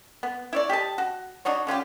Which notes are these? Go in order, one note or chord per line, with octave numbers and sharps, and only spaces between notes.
B3
E4 C#5 D5
G4 A4 D#5 A5
F#4
D4 D#4 F#4 C#5
D3 C#4 F4 G4